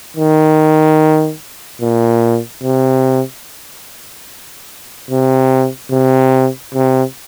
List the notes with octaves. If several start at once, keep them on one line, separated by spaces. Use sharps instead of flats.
D#3
A#2
C3
C3
C3
C3